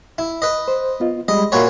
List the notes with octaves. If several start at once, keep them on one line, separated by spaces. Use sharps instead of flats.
E4
B4 D#5
C5
B3 F4 D#5
G3 G#3 D#5 B5
A#2 F#4 C#5 E5 B5 C6